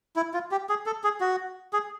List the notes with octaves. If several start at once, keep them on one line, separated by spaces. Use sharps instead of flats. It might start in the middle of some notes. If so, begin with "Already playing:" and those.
E4
F4
G4
G#4
A4
G#4
F#4
G#4